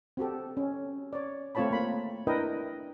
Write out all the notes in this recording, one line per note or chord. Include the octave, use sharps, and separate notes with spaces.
C4 F#4 G4 A4
C#4
C#5 D5
A3 C4 F4 C#5 A5 B5
A#3 B5
D4 E4 A#4 B4 D#5 G5